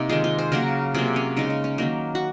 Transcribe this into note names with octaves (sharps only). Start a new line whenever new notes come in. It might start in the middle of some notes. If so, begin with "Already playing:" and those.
Already playing: C3 A#3 D#4
D#3 G#3 F4 G#4
F4 G#4
G#4 C5
C#3 F#3 A#3 F#4 A#4
C3 F#3 A#3 F4 G#4
C#4
C#3 G#3 D#4
D#4
C#4
D#3 F#3 A#3 D#4
F#4